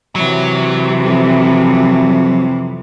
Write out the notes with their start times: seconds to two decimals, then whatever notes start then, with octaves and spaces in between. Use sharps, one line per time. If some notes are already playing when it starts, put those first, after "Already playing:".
0.16 C3 E3 F#3
1.05 F2